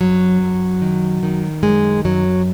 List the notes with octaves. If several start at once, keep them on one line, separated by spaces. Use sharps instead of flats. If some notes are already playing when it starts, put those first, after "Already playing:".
F#2 F#3
F#2
D#3
D#3
F#2 G#3
F#2 F#3